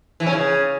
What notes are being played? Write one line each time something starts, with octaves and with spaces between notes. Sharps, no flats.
E3
C#4
C#3